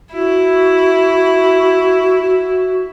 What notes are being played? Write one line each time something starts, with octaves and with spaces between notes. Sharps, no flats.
E4 F#4